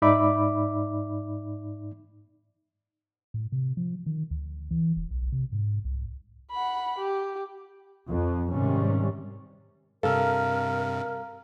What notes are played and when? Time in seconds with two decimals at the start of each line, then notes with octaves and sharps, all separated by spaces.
0.02 G#2 D#4 D5 E5 B5 D6
3.34 A2
3.52 C3
3.77 F3
4.06 D#3
4.31 D2
4.71 E3
4.96 E1
5.11 B1
5.32 C3
5.53 G#2
5.85 C2
6.51 F#5 B5
6.98 G4
8.08 F2
8.51 G#2 C3 D#3 G3 C#4
10.03 G2 C3 A4 A#4 F5 A#5 F6